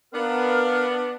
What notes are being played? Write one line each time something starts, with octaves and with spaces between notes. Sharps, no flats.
B3 D4 A#4 F5 F6